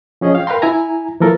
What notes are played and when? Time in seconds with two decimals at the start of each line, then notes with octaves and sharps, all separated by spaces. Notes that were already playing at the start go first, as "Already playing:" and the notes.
0.21 F3 C#4 G#4 D#5
0.35 F5 G5
0.47 A#4 B4 F5 G5 A#5 C6
0.62 E4 G#5 A#5
1.20 E3 F3 A#3 A4 A#4